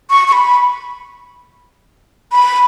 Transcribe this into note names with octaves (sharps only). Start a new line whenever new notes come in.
C#6
C#6
B5
B5